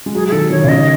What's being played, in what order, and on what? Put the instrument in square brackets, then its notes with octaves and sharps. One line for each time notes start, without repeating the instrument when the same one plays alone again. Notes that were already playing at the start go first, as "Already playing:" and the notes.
[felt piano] G#3
[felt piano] F#3 [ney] G#4
[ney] G#4
[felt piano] D#3 [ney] A4
[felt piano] D#3 [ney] C#5
[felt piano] C#3
[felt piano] D#3 [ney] D#5